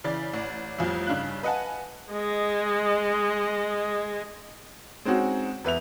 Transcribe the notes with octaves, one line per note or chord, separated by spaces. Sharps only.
C#3 E3 D5 A6
A1 D5
A1 F2 F3 G3
G2 C#3 D4 D#4 F5 F#6
B4 D#5 F5 F#5 G#5 A5
G#3 D#5
G#3 C4 C#4 D#4 F#4
E2 B4 E5 F7